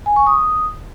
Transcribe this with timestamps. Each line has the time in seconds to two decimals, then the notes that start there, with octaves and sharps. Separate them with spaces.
0.06 G#5
0.16 C#6
0.27 D#6